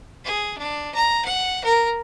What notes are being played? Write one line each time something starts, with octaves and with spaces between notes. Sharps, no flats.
G#4
D4
A#5
F#5
A#4